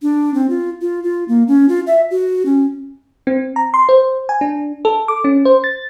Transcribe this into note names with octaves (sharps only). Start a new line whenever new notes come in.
D4
C4
F4
F4
F4
A#3
C#4
F4
E5
F#4
C#4
C4
A#5
C6
C5
G#5
D4
A4
D6
C#4
C5
A6